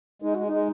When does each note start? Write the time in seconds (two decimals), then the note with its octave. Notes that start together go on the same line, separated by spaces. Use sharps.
0.22 G#3 D#4
0.35 G#3 F#4
0.47 D#4
0.52 G#3